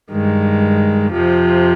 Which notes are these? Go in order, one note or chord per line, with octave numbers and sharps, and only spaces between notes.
G2 D#3 G#3
F2 C3 F3